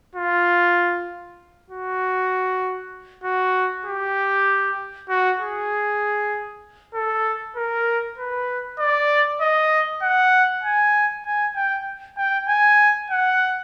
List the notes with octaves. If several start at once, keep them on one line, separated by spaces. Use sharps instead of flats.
F4
F#4
F#4
G4
F#4
G#4
A4
A#4
B4
D5
D#5
F#5
G#5
G#5
G5
G5
G#5
F#5